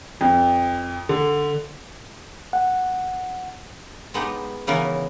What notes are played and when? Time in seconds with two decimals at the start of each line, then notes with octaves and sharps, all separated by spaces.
0.21 F2
1.09 D3
2.53 F#5
4.14 G#3 B3 D#4 G4
4.67 C#3 E3 B3 A#4